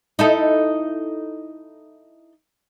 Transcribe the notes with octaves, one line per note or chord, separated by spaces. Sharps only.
D#4 E4 A4